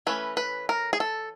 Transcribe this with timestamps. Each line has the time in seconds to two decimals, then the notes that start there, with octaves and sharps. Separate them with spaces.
0.07 E3 A3 C#4 B4
0.37 B4
0.69 A#4
0.93 G#4
1.00 A4